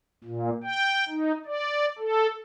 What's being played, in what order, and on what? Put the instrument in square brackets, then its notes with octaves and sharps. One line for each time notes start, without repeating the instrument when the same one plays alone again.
[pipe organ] A#2
G5
D#4
D5
A4